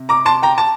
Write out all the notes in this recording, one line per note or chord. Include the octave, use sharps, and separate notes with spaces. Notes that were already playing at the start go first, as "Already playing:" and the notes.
Already playing: C3
A#5 D6
A5 C6
G5 A#5
A5